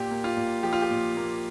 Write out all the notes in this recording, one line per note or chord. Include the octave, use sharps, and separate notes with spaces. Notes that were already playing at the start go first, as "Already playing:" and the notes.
Already playing: A#2 G4
A#3
F4
A#2
F3 G4
F4
G4
A#2
A#3